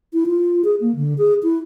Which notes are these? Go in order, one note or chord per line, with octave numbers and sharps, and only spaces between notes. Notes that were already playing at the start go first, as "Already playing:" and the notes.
E4
F4
G#4
A#3
D3
G#4
E4